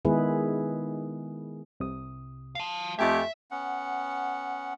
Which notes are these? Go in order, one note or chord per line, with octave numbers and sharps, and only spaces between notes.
D#3 G#3 B3 E4 G#4 B4
C2 C3 D#6
F5 A5
F2 A3 G4 D#5 E5 G#5
B3 C#4 F#5